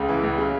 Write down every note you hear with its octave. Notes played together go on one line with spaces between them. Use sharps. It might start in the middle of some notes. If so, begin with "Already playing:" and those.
Already playing: C#2 C#3
E3
C#2
C#3